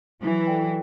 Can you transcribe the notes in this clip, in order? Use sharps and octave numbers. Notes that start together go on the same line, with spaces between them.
E3 F#3 E4
A4 D5 G5